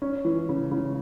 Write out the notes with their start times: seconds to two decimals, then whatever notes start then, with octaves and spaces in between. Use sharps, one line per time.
0.02 C#4
0.25 E3
0.49 C#3
0.71 C#3